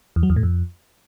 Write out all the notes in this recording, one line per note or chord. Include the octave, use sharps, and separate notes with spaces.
E2
F#3
E2
A2
F2